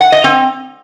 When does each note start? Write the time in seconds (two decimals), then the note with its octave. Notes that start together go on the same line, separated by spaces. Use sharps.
0.01 F#5
0.12 D#5
0.24 C4